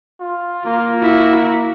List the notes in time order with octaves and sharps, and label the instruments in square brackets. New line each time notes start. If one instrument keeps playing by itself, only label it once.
[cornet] F4
[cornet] A#3 [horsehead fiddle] F4
[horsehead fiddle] E4 F#4